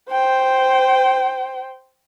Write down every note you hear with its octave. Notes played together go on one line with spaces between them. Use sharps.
C5 G5